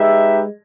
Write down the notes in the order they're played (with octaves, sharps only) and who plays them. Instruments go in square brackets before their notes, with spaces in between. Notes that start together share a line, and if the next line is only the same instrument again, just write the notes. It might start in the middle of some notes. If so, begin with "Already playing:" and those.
Already playing: [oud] G#3 [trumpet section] D#4 G4 B4 E5